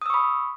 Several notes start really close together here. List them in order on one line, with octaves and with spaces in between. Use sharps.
D#6 E6 C#6 B5